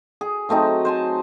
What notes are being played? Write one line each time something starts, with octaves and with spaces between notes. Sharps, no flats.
G#4
F#3 A3 C4 D#4
C5 G#5 A5